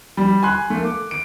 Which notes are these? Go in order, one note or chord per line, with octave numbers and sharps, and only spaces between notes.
G3
G#5 C6 F#6
A3 A#3
D6
D7